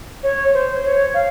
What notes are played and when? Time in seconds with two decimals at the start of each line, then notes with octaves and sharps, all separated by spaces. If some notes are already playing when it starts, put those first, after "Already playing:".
0.23 C#5
0.54 C5
0.84 C#5
1.14 F5